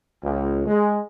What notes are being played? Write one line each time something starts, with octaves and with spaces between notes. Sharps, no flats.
C#2
G#3